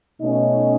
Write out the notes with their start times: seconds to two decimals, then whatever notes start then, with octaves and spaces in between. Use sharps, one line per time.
0.20 B2 A3 C#4 D#4